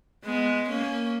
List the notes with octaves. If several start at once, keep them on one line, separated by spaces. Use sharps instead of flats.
G#3 B3
A#3 C#4